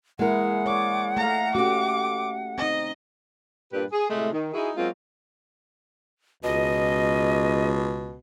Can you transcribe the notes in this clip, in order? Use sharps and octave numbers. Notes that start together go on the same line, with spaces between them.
G#3 A#3 E4 G#4 A#4 F#5
C#5 D5 D6
A3 F5 A#5
A3 C#4 F#4 G4 D6
C4 D#4 D#5
G2 A#2 D4 G4 B4
G#4
A2 C3 G#3 A3
D#3
D#4 E4 F#4 G#4
F#3 G#3 A#3 C4 F4
C#2 B2 D#5